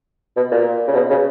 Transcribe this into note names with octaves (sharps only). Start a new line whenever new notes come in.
B2
A#2
C#3
B2
C#3